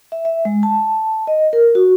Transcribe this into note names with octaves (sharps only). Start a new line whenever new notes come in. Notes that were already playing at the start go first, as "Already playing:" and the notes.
E5
E5
G#3
A5
D#5
A#4
F#4